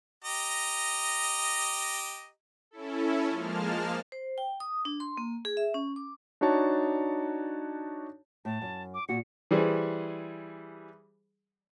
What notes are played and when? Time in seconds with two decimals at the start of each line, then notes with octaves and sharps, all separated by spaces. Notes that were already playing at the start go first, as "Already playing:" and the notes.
0.24 G4 D#5 A#5
2.71 C#4 E4 A4
3.29 F3 G#3 A#3 A5 F6
4.12 C5
4.38 G5
4.60 D#6
4.85 D4
5.00 C6
5.17 A#3
5.45 G#4
5.57 E5
5.74 C#4
5.96 D6
6.41 D4 D#4 F#4 C#5 A5
8.45 A2 A5
8.62 F#2
8.94 D6
9.09 A#2 F#4 C#7
9.51 E3 G3 G#4 C5